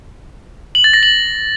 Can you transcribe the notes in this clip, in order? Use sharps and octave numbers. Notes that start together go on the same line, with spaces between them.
F#7
A6
A#6
F#7